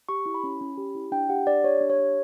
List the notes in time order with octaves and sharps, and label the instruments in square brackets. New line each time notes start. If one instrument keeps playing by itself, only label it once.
[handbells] G4 C#6
E4
B5
C#4
C#4
G4
E4
D4 G5
G4 F#5
D4 D5
G4 C#5
D4
C#5
G4